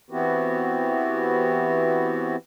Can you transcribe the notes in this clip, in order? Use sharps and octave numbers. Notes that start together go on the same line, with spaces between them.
E3 B3 C4 E4 F#4 G4